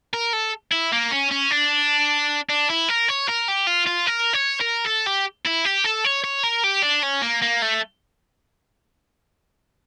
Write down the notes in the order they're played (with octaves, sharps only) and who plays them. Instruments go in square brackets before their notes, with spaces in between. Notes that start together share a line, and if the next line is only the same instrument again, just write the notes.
[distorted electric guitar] A#4
A4
E4
A#3
C#4
C#4
D4
D4
E4
A#4
C#5
A#4
G4
F4
F4
A#4
C#5
A#4
A4
G4
E4
G4
A4
C#5
C#5
A#4
G4
D4
C#4
A#3
A#3
A3